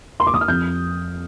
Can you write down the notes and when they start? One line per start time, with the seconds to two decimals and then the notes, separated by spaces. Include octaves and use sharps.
0.20 C6
0.27 D6
0.34 D#6
0.41 F6
0.48 F2 G6